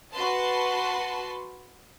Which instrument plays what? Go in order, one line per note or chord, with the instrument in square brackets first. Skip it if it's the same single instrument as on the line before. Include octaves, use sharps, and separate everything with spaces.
[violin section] F#4 B4 A5 C6